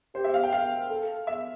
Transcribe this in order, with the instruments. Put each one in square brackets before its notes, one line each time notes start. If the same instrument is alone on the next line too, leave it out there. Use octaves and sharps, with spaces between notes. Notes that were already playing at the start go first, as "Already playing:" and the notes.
[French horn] G4 [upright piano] C5
[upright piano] E5
F5
G5
F5
[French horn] A4
[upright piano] E5